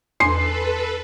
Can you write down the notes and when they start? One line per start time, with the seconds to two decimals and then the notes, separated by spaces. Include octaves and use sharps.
0.20 E2 D4 A4 B4 G#5 C6 C7